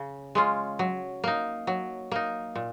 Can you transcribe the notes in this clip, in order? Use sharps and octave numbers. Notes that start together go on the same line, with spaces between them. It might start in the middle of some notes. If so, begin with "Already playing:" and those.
Already playing: C#3
G#3 C#4 F4
F#3
A#3 D#4
F#3
A#3 D#4
A#2